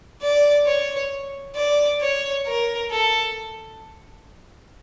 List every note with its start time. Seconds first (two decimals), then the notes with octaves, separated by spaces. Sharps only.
0.22 D5
0.66 C#5
1.56 D5
2.01 C#5
2.46 A#4
2.91 A4